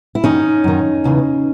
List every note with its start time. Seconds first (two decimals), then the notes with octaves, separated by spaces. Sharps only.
0.15 E4
0.24 F#2 D#3 C#4 D#4
0.64 F#2 D#3
1.04 E2 C#3 E3